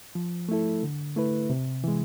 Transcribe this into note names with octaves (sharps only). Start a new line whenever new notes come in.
F3
A3 E4 A4
D3
A3 E4 B4
C3
E3 G#3